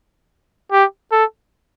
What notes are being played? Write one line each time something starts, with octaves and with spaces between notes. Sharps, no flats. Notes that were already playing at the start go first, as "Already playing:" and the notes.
G4
A4